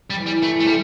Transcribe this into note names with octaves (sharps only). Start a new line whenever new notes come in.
G3
E3
G3
A3 E4
A3
D3 G3